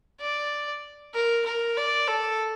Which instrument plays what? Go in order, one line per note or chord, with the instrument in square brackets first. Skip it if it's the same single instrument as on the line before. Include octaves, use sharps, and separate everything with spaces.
[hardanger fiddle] D5
A#4
A#4
D5
A4